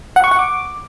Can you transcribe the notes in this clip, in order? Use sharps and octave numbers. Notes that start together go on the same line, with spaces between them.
F#5
C#6
F#5
D6